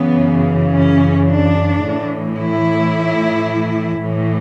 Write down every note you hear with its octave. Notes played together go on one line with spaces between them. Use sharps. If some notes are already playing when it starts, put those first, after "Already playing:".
Already playing: F#2 C#3 E3 B3
C#4
D4
A2 E3
E4
A2 E3